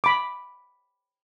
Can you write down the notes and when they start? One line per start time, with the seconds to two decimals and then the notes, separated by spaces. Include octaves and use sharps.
0.04 B5 D6